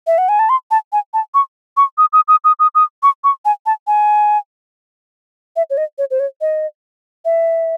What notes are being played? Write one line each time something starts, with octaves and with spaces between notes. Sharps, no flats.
E5
F#5
G#5
A5
C6
A5
G#5
A5
C#6
C#6
D#6
D#6
D#6
D#6
D#6
D#6
C#6
C#6
G#5
A5
G#5
E5
C#5
D#5
C#5
C5
C#5
D#5
E5